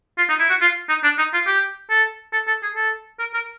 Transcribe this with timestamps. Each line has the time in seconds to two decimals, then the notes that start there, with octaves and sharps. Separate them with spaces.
0.18 F4
0.29 D#4
0.40 E4
0.50 F#4
0.61 F4
0.89 D#4
1.04 D4
1.18 D#4
1.33 F4
1.47 G4
1.90 A4
2.33 A4
2.47 A4
2.63 G#4
2.76 A4
3.19 A#4
3.34 A#4